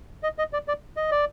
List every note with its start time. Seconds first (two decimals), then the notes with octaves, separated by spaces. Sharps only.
0.23 D#5
0.38 D#5
0.53 D5
0.68 D5
0.97 D#5
1.11 D5